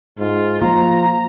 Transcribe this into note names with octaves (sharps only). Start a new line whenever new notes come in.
G#2 F4
F3 A#3 F4 A#5